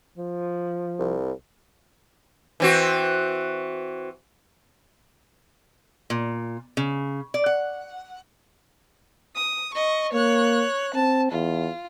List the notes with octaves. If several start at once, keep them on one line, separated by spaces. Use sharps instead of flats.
F3
C2
E3 C4 F#4
A#2
C#3
D5
F#5
D#6
D#5 C#6
A#3 C#5 F#6
C4 A5
E2 F4